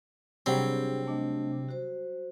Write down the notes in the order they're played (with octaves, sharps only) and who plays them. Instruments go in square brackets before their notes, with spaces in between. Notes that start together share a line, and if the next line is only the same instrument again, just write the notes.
[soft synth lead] C3 [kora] F#3 G3 [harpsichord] C4 [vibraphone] D4 G#4
[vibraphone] A3 D4 D#5
F#4 C5